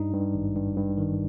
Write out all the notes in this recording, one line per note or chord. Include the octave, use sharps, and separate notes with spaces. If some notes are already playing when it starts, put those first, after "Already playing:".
Already playing: G2 D#4
G2
G#1
G2
G2
D#3